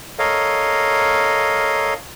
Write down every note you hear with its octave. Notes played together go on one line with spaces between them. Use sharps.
A4 A#4 C#5 D#5 F5